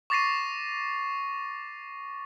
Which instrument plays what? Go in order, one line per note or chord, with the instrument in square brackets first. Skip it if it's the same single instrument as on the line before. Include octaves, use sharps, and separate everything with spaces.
[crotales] C#6 D6 A6 A#6 C7 D#7